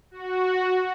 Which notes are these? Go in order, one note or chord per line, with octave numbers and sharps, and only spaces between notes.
F#4